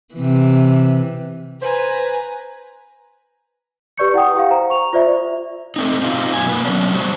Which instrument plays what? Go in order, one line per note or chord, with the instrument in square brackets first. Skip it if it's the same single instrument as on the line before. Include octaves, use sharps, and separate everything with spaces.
[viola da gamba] C3 E3
[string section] B4 [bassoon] C5 [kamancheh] G#5 A#5
[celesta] G4 B4 D5 C#6 G6 C#7
E4 F#5 G5 D#6
G4 F5
C5 A#5
C#6 F7
F4 C5 D5 E5
[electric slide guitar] A3 C4 D#4
C4 D#4 F4
F#2 B2 G#5
A#3 B4
F#3 B3 C#4 D4
D3 G3 C5 C#5